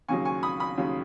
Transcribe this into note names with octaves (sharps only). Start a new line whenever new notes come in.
D#2 C#3 F#3 G#5 C#6
G#5 C#6
B5 D#6
B5 D#6
D#2 C#3 F#3